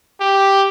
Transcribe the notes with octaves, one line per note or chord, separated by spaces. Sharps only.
G4